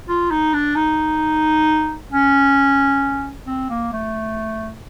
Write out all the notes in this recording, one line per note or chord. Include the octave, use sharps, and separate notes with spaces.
F4
D#4
D4
D#4
C#4
C4
A#3
A3